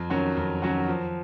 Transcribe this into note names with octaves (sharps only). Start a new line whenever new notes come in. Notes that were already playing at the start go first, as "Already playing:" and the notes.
Already playing: F2
D#3 F#3 C#4 F#4
F2
D#3 F#3 C#4 F#4
F3